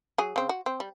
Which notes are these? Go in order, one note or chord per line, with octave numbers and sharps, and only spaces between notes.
F#3 G#4
C#3 C4
F#4
C4
G3